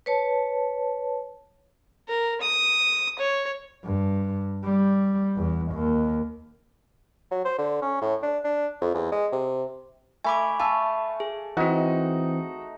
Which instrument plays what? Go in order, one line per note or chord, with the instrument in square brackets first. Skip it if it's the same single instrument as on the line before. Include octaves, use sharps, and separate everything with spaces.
[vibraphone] B4 C#5 A5
[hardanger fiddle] A#4
D#6
C#5
[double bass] G2
G3
E2
D#2
[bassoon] F#3
C5
D3
C#4
A2
D4
D4
F2
E2
G#3
C3
[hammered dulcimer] A3 [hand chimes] G#5 B5 D6
[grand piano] F5 G#5 E6 [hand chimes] A5 B5
[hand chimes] G#4
[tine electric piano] E3 C4 [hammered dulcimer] D#4 [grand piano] F#4